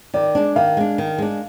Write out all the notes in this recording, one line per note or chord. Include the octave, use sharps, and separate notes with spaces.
D#3 D5
G#3 D4
D#3 F5
G#3 D4
D#3
G#3 D4